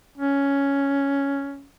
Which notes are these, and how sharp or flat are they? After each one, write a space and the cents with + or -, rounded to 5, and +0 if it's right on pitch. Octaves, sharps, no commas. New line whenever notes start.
C#4 +5